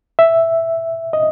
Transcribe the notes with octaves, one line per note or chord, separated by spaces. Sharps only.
E5
D#5